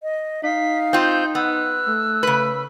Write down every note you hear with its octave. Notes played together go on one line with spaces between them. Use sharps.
D#5
D#4 F5 B6
C4 F4 G6
B3 E6 F#6
A3
C#3 B4